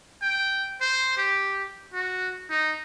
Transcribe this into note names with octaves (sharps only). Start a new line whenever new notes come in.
G5
C5
G4
F#4
D#4